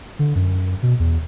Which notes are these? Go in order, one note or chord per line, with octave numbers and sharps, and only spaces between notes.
D3
F#2
B2
E2